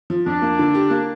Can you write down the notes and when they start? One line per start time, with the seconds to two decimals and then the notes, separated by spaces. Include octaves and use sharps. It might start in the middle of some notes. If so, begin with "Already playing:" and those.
0.10 F3
0.26 F2 D4
0.42 A#3
0.59 D3
0.75 G4
0.90 A#3